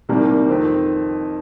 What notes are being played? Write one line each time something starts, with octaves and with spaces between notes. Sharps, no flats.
C2 C3 D#3 G3 A#3
F2 D#3 C4